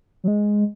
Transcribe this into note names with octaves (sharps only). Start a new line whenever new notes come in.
F#3
G#3